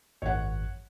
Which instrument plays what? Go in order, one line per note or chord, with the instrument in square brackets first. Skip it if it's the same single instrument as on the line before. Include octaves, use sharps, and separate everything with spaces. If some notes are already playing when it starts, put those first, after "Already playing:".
[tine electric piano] G#1 F#2 [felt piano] C#5 F#5